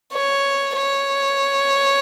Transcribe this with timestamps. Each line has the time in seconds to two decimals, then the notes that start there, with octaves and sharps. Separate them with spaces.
0.13 C#5
0.77 C#5